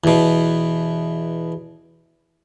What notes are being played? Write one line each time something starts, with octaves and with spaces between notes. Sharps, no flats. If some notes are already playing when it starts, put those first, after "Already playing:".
E2 B2